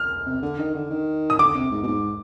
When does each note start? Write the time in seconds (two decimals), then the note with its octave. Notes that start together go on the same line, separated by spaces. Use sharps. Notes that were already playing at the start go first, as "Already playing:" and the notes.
Already playing: F6
0.26 C3
0.42 D3
0.59 D#3
0.75 D3
0.90 D#3
1.30 D#6
1.38 D3 D6
1.55 C3
1.71 G#2
1.83 B2
1.87 G#2